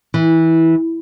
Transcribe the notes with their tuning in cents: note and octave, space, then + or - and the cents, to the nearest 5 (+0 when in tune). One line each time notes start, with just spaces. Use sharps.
E3 -15